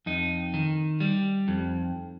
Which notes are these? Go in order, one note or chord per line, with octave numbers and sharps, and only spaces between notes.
F2 D#4
D#3
G3
F2